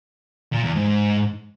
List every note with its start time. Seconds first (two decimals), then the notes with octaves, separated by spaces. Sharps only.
0.53 A#2
0.64 E2
0.76 G#2